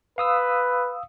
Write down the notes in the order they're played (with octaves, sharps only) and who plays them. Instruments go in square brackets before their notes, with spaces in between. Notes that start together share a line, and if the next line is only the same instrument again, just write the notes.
[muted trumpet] B4 [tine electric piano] F5 D#6 E6